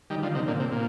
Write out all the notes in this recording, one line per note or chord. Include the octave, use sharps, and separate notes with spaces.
D#3 G3
D3 F3
C3 D#3
A#2 D3
C3
A#2